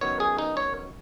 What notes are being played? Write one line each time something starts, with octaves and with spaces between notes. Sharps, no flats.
F#2 D#3 B3 C#5
G#4
D#4
C#5